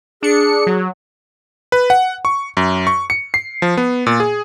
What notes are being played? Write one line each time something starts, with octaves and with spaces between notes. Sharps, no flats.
D4 G#4 C#7
F#3
B4
F#5
C#6
F#2
C#6
C#7
C7
F3
B3
A#2
G#4